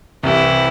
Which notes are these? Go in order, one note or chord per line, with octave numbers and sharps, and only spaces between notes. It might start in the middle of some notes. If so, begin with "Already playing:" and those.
C2 C3 E3 E4